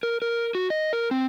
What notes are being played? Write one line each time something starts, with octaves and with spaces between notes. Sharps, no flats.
A#4
A#4
F#4
D#5
A#4
C4